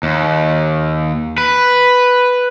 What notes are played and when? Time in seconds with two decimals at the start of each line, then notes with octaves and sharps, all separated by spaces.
0.03 D#2
1.38 B4